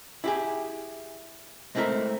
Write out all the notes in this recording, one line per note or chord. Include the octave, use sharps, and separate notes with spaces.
E4 G4 G#4
G#3 A3 C4 E4 A#4 E5